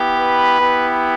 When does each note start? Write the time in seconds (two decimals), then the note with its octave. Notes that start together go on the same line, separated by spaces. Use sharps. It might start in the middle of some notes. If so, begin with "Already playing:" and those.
Already playing: B3 E4 G4
0.17 B4
0.58 B3 E4 G4